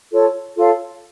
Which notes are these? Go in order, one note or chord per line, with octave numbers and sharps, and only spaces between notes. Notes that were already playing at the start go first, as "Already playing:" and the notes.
F4 A4 C#5
F4 A4 C#5 F5